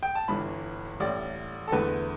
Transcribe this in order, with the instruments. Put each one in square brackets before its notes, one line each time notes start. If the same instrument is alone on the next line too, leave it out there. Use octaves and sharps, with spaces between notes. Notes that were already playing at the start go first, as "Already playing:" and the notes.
[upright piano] G5
A5
G1 G2 E3 B5
A1 A2 G3 D5
A4
E2 D3 A3 B4